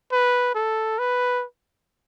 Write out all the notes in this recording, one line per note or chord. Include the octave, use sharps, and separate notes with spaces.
B4
A4
B4